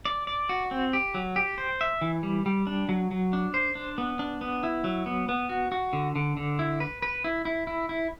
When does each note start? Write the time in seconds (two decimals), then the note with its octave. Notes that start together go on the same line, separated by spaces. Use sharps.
0.05 D5
0.27 D5
0.49 F#4
0.71 C4
0.93 G4
1.14 F#3
1.36 G4
1.58 C5
1.81 E5
2.01 E3
2.23 G3
2.46 G3
2.67 D4
2.89 F#3
3.11 F#3
3.33 D4
3.54 C5
3.75 D4
3.98 B3
4.19 D4
4.41 B3
4.63 E4
4.84 F#3
5.06 B3
5.29 B3
5.49 F#4
5.72 F#4
5.93 D3
6.16 D3
6.37 D3
6.59 E4
6.80 B4
7.02 B4
7.24 E4
7.45 E4
7.67 E4
7.89 E4